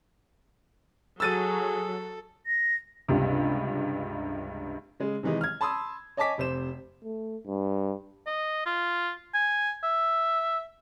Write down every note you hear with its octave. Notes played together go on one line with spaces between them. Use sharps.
F#3 G#4 A4 E6 A6 D#7
A#6
C#2 G2 C3
C#3 G#3
C3 D#3 E3 G#3 D#4
F6 G#6
A5 B5 C6 D#6 E6
C#5 D#5 G#5 A5 D6 B6
F1 C3 C5 E7
A3
G2
D#5
F4
G#5
E5